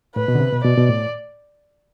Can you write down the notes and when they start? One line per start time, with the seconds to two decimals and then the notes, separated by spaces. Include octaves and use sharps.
0.16 A2 B4
0.28 B2
0.35 D3
0.40 C3
0.52 B2
0.64 B2 D5
0.77 B2
0.89 A2